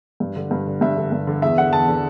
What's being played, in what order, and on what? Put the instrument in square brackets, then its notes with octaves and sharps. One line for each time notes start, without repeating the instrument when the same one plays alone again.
[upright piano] G2
D3
G2
D3
G2 E5
D3
G2
D3
E2 E5
D3 F#5
E2 A5
D3